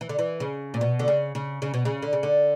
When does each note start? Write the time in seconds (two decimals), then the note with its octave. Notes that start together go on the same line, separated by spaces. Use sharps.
0.01 E3
0.09 D3
0.19 E3
0.40 C#3
0.74 A#2
0.81 B2
0.99 D3
1.08 C#3
1.35 C#3
1.62 C#3
1.74 B2
1.85 C#3
2.02 D3
2.13 C#3
2.23 D3